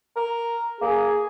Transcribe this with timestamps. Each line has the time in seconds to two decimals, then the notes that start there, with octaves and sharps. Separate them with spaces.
0.16 A#4
0.81 A#3 G#4